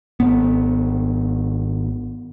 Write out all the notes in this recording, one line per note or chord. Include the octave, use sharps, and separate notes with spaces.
G#1 B3